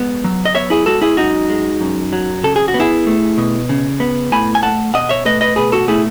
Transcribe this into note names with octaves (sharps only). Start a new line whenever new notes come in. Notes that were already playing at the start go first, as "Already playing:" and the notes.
Already playing: G#3 B3
F#3
D#5
B3 C#5 E5
E4 G#4
G#3 F#4 A4
E4 G#4
F#2 D#4 F#4
G#3
F#2
F#3
C#3 A4
G#4
F#4
B3
E4 G#4
A3
B2
C#3
B3
A2 G#5 B5
G#5
A3 F#5 A5
B2 D#5 F#5
C#5 E5
A3 B4 D#5
B4 D#5
B2 G#4 B4
F#4 A4
A3 E4 G#4